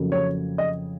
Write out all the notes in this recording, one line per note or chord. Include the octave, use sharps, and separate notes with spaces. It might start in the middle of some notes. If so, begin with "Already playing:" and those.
Already playing: F2 C#3 F#3 A#3
C#5
D#5